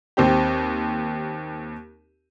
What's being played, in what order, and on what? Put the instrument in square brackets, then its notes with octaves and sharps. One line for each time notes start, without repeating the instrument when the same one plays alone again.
[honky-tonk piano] D#2 C4 G4